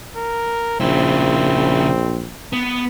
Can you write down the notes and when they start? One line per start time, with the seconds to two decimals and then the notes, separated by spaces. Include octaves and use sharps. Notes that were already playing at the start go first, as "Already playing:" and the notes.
0.16 A#4
0.81 A#1 C#3 C4 E4
2.53 B3